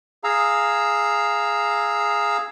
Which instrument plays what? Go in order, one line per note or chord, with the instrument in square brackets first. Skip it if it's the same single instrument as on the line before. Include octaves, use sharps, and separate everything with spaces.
[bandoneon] G#4 F5 A#5 E6